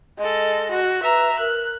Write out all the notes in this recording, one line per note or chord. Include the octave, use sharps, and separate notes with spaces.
G#3 A4 D#5
F#4
B4 E5 A#5
A#4 F#6